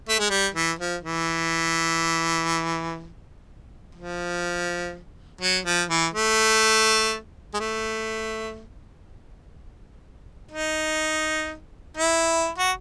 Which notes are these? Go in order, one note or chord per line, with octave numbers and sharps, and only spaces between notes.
A3
G#3
G3
E3
F3
E3
F3
F#3
F3
E3
A3
G#3
A3
D#4
E4
F#4